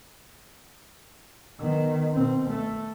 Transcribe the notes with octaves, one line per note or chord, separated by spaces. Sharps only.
D#3 B3
B2 C4
A3